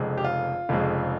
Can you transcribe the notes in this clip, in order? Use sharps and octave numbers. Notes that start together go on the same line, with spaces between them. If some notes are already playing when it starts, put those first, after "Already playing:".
Already playing: F1 F2 C#3 G#3
G4
F4
F1 F2 C#3 G#3